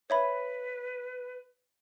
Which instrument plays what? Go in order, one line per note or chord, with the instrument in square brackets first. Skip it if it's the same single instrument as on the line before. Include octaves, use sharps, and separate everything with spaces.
[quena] B4 [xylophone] C#5 E5 B5